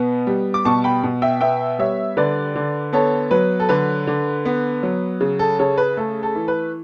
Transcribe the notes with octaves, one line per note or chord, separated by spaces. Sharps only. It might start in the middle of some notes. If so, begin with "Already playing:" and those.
Already playing: B2 B3
G3
D6
B2 A5 C#6
G5 B5
B2
E5 G5
B3 E5 G5
G3 C#5 E5
D3 B4 D5
D3
B3 A4 C#5
F#3 B4
A4
D3 B4
D3
B3
F#3
C#3
A4
C#3 A4 C#5
B4
A3 A4
A4
E3
B4